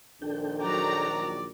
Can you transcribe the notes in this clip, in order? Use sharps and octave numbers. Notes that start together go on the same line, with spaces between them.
A#1 D#3 D4 A4 G5
F#3 D5 A#5